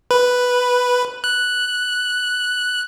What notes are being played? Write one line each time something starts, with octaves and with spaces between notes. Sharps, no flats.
B4
F#6